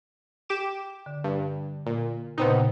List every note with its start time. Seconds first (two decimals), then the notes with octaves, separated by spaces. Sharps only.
0.49 G4 D6 E7
1.06 D3
1.24 G2
1.86 A#2
2.38 A#2 C#3 B3 C4 D#4